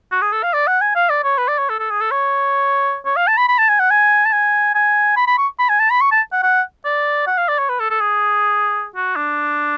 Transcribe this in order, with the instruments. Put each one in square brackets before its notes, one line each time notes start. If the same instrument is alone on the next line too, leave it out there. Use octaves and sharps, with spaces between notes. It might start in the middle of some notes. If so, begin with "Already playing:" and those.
[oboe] F#4
G#4
A4
F5
D5
F#5
G#5
F5
D5
C#5
B4
D5
C#5
A4
A4
G#4
A4
C#5
C#5
F5
A5
B5
B5
A5
G#5
F#5
G#5
A5
G#5
G#5
B5
B5
C#6
B5
G#5
A5
B5
C#6
A5
F#5
F#5
D5
F#5
F5
D5
C#5
B4
A4
A4
G#4
F#4
D4